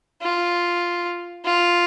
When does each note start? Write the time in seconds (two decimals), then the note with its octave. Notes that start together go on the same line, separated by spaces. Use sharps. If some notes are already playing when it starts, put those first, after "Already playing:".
0.22 F4
1.45 F4